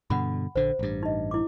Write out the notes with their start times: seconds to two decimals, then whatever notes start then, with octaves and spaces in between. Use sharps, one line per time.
0.10 G2 B2 D3 F#5 B5
0.56 A#1 D3 C5
0.79 A1 G2
1.03 D#4 D#5
1.31 E4 D6